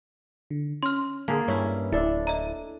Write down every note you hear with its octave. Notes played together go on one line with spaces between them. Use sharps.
D3
C#4 C6 F6
D3 A#3 G#4 F5 G#5 A5
G2 C#4 E4
D1 D4 E4 A4 E5
D#5 A#5